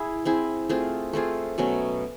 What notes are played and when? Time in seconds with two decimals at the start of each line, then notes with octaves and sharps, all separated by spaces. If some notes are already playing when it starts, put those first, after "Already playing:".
Already playing: E4 G#4
0.25 C4 E4 G#4
0.69 A3 C4 F4 G#4
1.13 A3 C4 F4 G#4
1.58 B2 F#3 A3 C#4